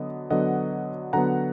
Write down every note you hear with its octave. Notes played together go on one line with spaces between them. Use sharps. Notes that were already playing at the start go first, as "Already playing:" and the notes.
Already playing: D3 F#3 B3 D#5
D3 F#3 B3 D#5 F#5
D3 F#3 B3 F#5 A#5